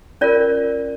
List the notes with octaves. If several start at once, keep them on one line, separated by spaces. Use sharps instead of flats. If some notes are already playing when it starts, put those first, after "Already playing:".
C#4 F4 A#4 D5